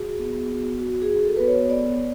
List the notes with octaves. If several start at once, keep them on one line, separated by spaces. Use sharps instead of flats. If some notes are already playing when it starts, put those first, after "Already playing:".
Already playing: F#4 G#4
B3
F#4
F#4
G#4
F#4
A4
B3 B4
C#5
B3 D5